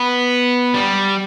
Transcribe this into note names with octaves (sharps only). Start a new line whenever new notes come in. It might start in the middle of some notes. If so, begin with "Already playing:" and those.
Already playing: B3
G3